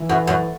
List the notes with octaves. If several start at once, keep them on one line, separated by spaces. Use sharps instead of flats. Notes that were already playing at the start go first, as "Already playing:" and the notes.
Already playing: E3
F#2
F#2